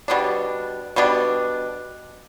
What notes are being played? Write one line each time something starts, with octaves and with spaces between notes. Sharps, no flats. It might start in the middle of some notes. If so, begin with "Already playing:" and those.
B2 G3 B3 D4
B2 G3 B3 D4